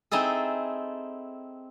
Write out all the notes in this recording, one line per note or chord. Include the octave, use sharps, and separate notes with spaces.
C4 D#4 E4 G#4 A4